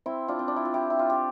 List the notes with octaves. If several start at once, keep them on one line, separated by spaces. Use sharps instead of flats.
C4 E4
D4 F4
C4
D4
E4
F4
E4 G4
E4
F4
G4